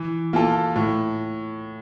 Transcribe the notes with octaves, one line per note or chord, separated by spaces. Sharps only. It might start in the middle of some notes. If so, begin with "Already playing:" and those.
Already playing: E3
A#3 F4 A4
A2